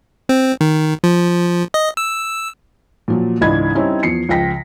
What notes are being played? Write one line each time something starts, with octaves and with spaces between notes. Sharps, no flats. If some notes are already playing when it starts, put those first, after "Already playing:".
C4
D#3
F3
D#5
E6
A#2 F3 F#3
C#2 G#2 E3 D4 B5 G#6
G3 C4 C#4 D#4 E4
E2 F3 C7 C#7
C#2 F3 G5 A#6 B6